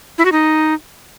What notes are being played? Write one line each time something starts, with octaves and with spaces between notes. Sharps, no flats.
E4
F#4
D#4